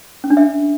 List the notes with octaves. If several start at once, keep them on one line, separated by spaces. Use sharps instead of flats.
C#4
D4
E5